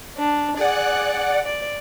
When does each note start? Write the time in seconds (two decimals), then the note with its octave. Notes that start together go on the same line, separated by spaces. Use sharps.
0.16 D4
0.57 G#4 D5 F#5 F#6
1.45 D5